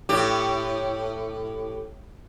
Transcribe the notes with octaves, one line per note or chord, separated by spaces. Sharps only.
A2 G4